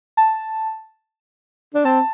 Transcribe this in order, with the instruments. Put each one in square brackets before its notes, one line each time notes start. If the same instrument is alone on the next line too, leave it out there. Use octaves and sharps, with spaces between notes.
[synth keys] A5
[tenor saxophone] D4
[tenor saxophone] C4 [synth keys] A5